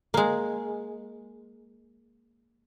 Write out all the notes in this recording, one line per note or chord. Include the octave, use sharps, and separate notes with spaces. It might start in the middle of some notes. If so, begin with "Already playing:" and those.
G#3 A#3